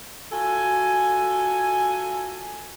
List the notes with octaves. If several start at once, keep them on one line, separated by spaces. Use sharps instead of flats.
F4 F#4 A4 G#5